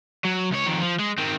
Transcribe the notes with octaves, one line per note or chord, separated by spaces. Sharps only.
F#3
C#2 C#5
F2 D#3
F3
G#3
D#3 C4